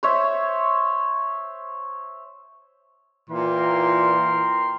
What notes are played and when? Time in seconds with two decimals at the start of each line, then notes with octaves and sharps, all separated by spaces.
0.03 C5 C#5 E5
3.30 A#2 E3 A#4 G5 C6